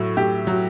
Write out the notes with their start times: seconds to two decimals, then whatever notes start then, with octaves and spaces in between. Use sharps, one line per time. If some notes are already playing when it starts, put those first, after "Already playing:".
Already playing: A2 F#3
0.17 A2 G4
0.47 F#3